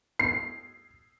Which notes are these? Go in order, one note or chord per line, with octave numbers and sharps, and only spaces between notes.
C7